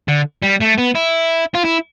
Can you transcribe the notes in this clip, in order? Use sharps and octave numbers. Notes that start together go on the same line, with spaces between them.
D3
G3
A3
B3
E4
F4
E4